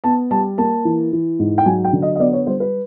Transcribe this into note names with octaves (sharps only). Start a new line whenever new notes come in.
B3 A5
G3 A5
A#3 A5
E3
E3
G#2
G5
F#3 G#5
G5
D3
D#5
D#5
B3 D5
C#5
G3 C5
B4